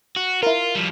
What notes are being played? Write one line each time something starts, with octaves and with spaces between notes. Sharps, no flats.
F#4
E4 F4 A#4
F3 G3